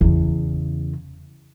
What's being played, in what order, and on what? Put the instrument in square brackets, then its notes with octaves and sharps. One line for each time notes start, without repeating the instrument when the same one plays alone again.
[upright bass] E2 C#3